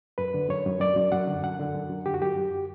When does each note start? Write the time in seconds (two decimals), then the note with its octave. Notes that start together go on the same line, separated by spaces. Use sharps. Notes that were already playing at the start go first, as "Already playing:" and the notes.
0.18 F#2 B4
0.34 D3
0.49 F#2 C#5
0.66 F#2
0.81 F#2 D5
0.96 F#2
1.12 F#2 F#5
1.27 D3
1.44 F#2 F#5
1.59 D3
1.75 F#2
1.90 F#2
2.06 D3 G4
2.14 F#4
2.22 F#2 G4
2.37 F#2